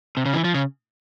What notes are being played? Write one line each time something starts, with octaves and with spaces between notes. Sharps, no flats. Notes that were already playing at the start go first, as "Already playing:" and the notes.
C3
C#3
E3
F3
C#3